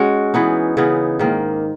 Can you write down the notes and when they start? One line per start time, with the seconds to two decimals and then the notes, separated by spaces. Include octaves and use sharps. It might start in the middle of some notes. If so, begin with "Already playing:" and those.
Already playing: G#3 C#4 F#4
0.34 E3 B3 D#4
0.77 C#3 E3 B3 D#4
1.19 G#2 D#3 A#3